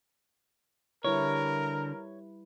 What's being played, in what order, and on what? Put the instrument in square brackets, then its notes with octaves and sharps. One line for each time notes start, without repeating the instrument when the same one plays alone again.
[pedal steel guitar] D3 [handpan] G3 E4 B4 [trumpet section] A#4 [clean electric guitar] C#5